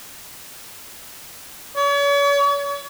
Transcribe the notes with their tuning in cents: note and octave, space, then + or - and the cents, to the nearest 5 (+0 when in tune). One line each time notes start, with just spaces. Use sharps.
C#5 +40